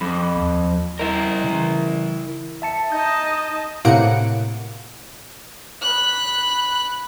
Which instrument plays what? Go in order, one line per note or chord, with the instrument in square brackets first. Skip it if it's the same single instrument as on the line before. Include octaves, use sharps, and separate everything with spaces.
[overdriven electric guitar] F2 [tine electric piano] B5 D6
[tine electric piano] D#2
[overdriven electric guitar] E4 A#4 [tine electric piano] D#5
[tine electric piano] C#3 E3
E5 A5 C#7
[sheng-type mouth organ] D#4 [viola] D#5 A5 [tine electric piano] G6
[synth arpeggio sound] A2 C3 A#3 F#5 C#7 D7
[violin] B5 F#6